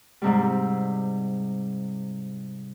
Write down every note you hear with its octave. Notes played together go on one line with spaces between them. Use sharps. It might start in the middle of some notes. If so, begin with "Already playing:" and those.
G#2 C3 G3